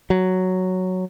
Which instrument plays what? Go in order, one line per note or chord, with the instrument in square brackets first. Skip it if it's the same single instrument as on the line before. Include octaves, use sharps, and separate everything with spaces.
[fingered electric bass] F#3